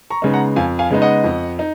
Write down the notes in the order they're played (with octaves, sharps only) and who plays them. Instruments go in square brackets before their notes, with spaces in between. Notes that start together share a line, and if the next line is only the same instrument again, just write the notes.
[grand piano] A#5 C#6
C#3 G#3 B3 D#4
F#5 A#5
F2 F5 G#5
F5 G#5
C#3 G#3 B3 D#4
D#5 F#5
F2
D#4